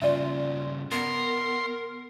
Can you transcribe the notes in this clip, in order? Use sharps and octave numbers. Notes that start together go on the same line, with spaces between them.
G2 C#3 F4 D5 E5
B3 A#4 C6